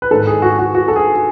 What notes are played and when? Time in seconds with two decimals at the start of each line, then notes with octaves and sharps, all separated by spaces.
0.02 B4
0.11 G#2 D#3 A4
0.27 G#4
0.42 F#4
0.59 F#4
0.75 F#4
0.88 A4
0.96 G#4